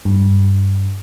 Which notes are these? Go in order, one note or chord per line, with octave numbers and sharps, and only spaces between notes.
G2